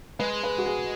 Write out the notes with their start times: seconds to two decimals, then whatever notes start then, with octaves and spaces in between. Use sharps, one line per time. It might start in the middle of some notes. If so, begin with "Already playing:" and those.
0.19 G#3 B4
0.43 B4
0.58 F#4
0.66 G#4